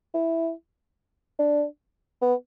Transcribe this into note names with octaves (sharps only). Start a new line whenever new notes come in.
E4
D4
B3